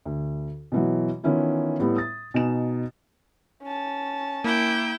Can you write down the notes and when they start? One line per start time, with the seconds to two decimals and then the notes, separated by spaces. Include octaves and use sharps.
0.05 D2
0.72 B2 E3 F#3
1.24 D#3 E3 B3 C#4 E4 F4
1.80 A2 G3 B3
1.97 D#6 A6
2.34 B2 D#4 G#5 E7
3.63 C#4 A5
4.44 A#3 E4 G5